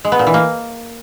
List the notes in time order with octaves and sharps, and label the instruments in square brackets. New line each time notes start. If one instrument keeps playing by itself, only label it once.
[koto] G#3
B3
A#2
E3
A#3